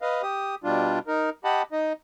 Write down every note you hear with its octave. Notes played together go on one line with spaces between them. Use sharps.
B4 D#5 F5
G4 D#6
B2 G3 D4 F4
D#4 A#4
G4 D#5 F#5 A5 B5
D#4 D#5